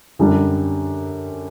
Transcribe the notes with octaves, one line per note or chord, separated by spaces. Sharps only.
F#2 D3 G3 D4